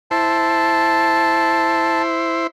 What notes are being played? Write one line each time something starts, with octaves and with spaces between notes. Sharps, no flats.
E4 C5 A5